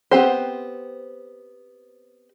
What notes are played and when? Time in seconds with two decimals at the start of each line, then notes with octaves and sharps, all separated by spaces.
0.11 B3 C4 G4 C5